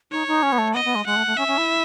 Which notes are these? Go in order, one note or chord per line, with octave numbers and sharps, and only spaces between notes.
D#4 C#5
D#4
C#4
B3
A3
B3 D#5
B3
G#3
G#3 F#5
A3
A3
C#4 E5
C#4
E4